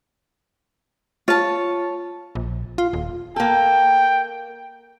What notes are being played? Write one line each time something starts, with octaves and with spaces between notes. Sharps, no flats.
F4 C#5 A5
A#1
F4
D#1
A#3 A4 G5